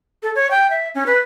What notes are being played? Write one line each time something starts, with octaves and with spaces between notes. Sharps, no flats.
A4
C#5
G5
E5
C#4
B4